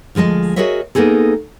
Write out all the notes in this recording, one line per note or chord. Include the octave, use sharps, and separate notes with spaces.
D2 F3 G#3 D#5 A5
F#4 G#4 A#4 C#5 D#5 E5
A#3 B3 D4 D#4 G#4 A4